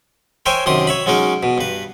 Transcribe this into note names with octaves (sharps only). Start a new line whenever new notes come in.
A#4 C5 C#5 E5 G5 G#5
F#2 C3 D#3 C6 D#6
C#5 E5 B5
F#3 G#3 C#4 D#4 A#4
B2
G2 B4